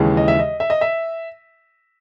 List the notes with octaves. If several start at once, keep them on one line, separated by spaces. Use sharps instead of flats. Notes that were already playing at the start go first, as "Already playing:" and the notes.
Already playing: D#2 C#3 E3 G#3
D#5
E5
D#5
E5
D#5
E5